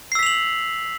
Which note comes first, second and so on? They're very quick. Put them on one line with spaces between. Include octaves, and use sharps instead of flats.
C7 E6 B6 F7 F#7